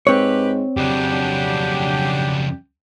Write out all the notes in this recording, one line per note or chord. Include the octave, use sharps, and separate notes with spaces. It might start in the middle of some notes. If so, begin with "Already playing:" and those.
G#2 C4 G4 B4 C#5
F2 C#3 F#3 D4 G4